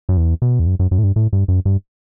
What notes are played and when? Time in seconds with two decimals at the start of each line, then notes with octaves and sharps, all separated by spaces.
0.09 F#2
0.17 E2
0.42 B2
0.59 E2
0.67 F#2
0.79 F#2
0.91 F#2
0.98 A2
1.03 G2
1.16 A2
1.33 G2
1.48 F#2
1.65 G2